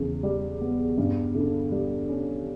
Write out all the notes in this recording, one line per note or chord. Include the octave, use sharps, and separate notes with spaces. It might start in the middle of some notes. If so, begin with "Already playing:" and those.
Already playing: E2 C#3
G3
B3
G2
D3
G3
C#4